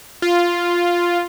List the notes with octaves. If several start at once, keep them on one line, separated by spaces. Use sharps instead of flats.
F4